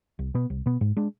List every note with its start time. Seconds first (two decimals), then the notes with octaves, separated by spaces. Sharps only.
0.19 C2
0.34 B2 B3
0.50 C2
0.66 B2 B3
0.81 G#2
0.97 G#3 D4